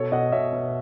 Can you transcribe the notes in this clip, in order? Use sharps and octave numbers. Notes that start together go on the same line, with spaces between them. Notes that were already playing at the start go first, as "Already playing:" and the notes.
Already playing: B2 A4 C#5
B2 D#5 F#5
B2 C#5 E5
B2